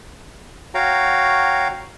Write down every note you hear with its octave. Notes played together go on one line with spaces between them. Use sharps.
F#4 C#5 F5 G5 A#5